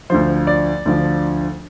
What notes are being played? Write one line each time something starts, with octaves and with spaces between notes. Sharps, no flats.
D2 D3 F3 C5
D5
D2 D3 F3